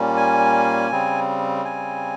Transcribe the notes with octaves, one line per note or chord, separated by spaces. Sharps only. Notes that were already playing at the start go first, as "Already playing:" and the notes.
Already playing: A#2 G3 A#3 C#4
G#5
C#3 G3 C4
G#5